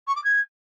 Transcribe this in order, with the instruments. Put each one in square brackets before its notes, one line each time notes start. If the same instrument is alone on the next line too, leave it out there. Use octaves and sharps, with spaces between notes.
[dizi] C#6
D6
G#6